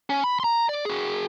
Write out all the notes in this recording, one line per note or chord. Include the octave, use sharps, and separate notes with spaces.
C#4
B5
A#5 C6
D5
F#4 G#4